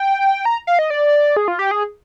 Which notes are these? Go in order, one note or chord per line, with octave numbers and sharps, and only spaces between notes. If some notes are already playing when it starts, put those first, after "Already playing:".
Already playing: G5
A#5
F5
D#5
D5
G#4
F4
G4
G#4